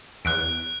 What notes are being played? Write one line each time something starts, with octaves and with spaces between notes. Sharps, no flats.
E2 F#6 D7